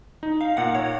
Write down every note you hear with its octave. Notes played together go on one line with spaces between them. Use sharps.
D#4
F5
A#2 F#5
C#5